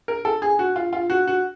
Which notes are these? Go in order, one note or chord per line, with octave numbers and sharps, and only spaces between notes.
A#4
A4
G#4
F#4
F4
F4
F#4
F#4